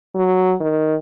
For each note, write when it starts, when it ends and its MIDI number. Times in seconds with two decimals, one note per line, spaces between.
0.15 0.55 54
0.60 0.95 51